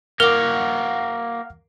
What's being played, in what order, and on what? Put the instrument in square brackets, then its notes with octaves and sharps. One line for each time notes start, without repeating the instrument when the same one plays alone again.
[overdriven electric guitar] A#3 F#4 [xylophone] A#4 D6 [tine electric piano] F#5 F6